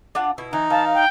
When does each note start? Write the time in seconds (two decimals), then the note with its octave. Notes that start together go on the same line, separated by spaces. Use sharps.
0.15 D4 F4 F#5
0.38 B2 E4
0.53 E3 D#4
0.70 E3 F5 A5
0.94 G5